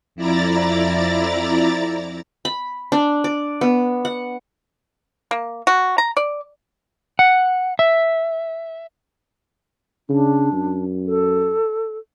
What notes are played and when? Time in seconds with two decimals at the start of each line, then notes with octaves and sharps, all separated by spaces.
0.16 F2 E4 D5 A#5 A6
2.45 B5
2.92 D4
3.24 D5
3.61 B3
4.05 F#5
5.31 A#3
5.67 F#4
5.98 A#5
6.17 D5
7.19 F#5
7.79 E5
10.10 C#3 D4
10.52 F#2
11.06 A4